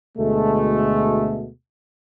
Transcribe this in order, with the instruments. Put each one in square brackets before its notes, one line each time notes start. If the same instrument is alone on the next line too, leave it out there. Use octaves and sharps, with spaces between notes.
[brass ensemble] D2 B2 G#3 A3